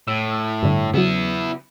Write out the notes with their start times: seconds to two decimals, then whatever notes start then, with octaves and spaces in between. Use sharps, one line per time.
0.08 A2 E6
0.63 G2 D3
0.94 C#3 F#3 B3 E4